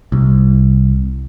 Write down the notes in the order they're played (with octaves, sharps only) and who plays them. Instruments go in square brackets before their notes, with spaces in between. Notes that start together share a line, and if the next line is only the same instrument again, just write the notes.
[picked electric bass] C2